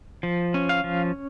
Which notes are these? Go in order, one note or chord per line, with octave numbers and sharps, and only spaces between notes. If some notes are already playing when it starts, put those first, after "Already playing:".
F3
C#4
F5
F3